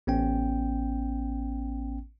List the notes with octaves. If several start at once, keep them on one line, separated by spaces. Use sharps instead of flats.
A1 B3 C#4 G5